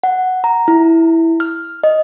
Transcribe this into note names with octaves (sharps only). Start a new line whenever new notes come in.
F#5
A#5
E4
F6
D#5